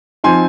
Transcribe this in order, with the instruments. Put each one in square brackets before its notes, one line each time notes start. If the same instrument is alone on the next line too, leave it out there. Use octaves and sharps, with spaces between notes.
[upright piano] F3 C4 D#4 G#5 C6